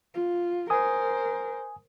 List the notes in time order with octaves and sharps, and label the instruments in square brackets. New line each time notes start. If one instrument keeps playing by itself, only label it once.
[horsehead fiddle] F4
[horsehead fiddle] A#4 C5 [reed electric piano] G#5 D#6